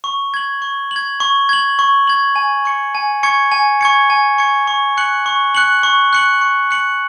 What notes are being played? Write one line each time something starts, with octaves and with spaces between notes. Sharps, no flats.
C#6
G#6 F#7
C#6
F#7
G#6
C#6
G#6 F#7
C#6
G#6 F#7
G#5
C#6 G#6 C#7
G#5
C#6 G#6 C#7
G#5
C#6 G#6 C#7
G#5
C#6 G#6 C#7
C#6
F#6 C#7 F#7
C#6
F#6 C#7 F#7
C#6
F#6 C#7 F#7
C#6
F#6 C#7 F#7